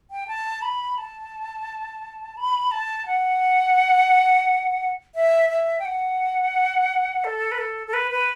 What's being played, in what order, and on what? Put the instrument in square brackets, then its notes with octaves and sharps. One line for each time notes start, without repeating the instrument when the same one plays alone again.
[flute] G5
A5
B5
A5
B5
A5
F#5
E5
E5
G5
F#5
A4
B4
A4
A4
B4
B4